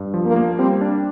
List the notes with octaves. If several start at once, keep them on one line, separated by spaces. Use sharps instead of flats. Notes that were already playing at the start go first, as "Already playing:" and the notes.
Already playing: G2
F3
A#3
A#3
G3 C4
D4